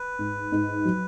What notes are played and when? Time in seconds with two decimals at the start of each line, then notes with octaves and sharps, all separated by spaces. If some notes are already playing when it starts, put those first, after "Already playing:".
Already playing: B4
0.19 G#2
0.52 G#2
0.85 F#3